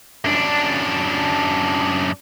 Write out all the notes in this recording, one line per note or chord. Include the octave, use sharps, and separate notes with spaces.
F#2 D4